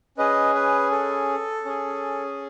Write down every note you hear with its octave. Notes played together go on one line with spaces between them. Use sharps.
C#4 G#4 B4 D#5
B4
A4
C#4 G#4